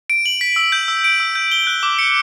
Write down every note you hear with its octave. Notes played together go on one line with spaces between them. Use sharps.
D7
F#7
B6
E6
G6
E6
D7
E6
G6
G7
F#6
D6
C#7